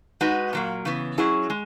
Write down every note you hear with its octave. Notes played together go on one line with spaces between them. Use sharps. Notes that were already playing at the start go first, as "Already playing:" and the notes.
G#3 D#4 F#4 B4
A#2 F#3 A#3
C#3 E3 B3
F#3 C#4 E4 G#4
G#3